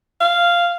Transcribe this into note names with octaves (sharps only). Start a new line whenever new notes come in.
F5